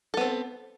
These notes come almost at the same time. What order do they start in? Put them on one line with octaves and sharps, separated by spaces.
A4 B3 C4